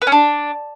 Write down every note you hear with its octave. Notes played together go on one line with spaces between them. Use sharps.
B4
C#4
D4